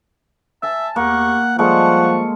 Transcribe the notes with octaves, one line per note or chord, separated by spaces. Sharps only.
E5 G#5 A5
E2 A#3 G4 F#5 C#6
F3 G3 G#3 A#3 A4 F#5 C#6